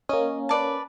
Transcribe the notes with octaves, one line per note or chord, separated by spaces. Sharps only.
A#3 C#4 D#5
B4 D5 A5